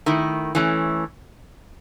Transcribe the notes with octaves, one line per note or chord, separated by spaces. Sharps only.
D#3 A3 E4
E3 A3 C#4